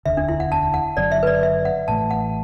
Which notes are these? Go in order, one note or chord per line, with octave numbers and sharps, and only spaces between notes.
E1 D2 D3 E5
D4
E4
F#5
A5
F#5
F#1 F#2 D3 F#3 D5
E5
B4
D5
E5
F#5
A1 A2 E3 A3 A5
F#5